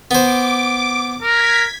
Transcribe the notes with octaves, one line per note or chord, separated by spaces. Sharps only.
B3 C5 D6
A#4 G#6 B6